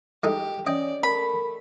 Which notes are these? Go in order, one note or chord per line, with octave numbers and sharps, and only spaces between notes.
G#3 D#4 G4 A4
C#4 D5 D#5 G5
A3 A#4 B5